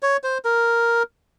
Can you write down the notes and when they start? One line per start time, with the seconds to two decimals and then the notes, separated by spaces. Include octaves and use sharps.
0.02 C#5
0.24 C5
0.45 A#4